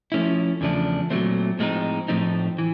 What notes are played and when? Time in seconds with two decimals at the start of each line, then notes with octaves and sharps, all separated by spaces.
0.12 F3 A3 C#4 E4
0.61 E2 C#3 F3 A3 D4
1.10 A#2 F#3 A3 C4
1.59 A2 F3 G#3 C4 D#4
2.08 A2 F3 A3 C4 D#4
2.58 E3